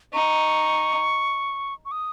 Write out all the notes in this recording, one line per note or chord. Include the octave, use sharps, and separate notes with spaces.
D#4 C#6
C#6
D#6